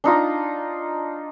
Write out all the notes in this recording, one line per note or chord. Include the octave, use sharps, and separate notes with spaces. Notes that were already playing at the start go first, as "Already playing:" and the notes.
D4 D#4 F4 D#5